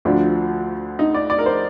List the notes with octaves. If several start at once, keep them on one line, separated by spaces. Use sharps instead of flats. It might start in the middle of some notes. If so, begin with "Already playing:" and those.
D2 D3 F3 D4
D#4
D5
D5
A#4
C5